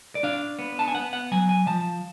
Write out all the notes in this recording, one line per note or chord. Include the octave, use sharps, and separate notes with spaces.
D5
D4 F5
B3
A5
G#5
B3 F#5
F#5
F#3 G#5
G#5
F3 A5